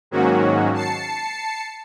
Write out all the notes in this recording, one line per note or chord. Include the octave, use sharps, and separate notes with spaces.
G#2 D#3 F#3 A#3 C#4 F#4
A5 C7 C#7